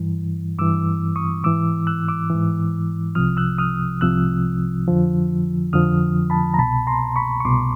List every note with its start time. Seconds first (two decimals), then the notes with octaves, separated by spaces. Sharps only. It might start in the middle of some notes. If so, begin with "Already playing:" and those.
Already playing: G2 E3
0.58 G2 E3 D6 E6
1.16 C#6 D#6
1.44 G#2 E3 D6 E6
1.87 E6 F#6
2.08 D6 E6
2.30 G#2 E3
3.15 C2 C3 F3 D#6 F6
3.37 E6 F#6
3.58 D#6 F6
4.01 C2 C3 F3 E6 F#6
4.88 F2 D3 F3
5.73 F2 D3 F3 D#6 F6
6.30 A5 B5
6.54 A#5
6.59 C2 B2 A5 B5
6.87 A#5 C6
7.16 B5 C#6
7.40 C#6
7.44 C2 B2 C6 D6